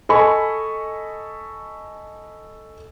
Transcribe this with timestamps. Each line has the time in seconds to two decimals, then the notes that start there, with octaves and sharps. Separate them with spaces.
0.09 A4 D#5 G#5 B5 C#6